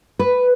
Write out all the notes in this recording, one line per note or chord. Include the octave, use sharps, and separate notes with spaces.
B4